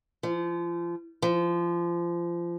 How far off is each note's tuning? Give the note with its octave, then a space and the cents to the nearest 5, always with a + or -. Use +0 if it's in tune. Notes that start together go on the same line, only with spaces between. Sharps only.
F3 -30
F3 -25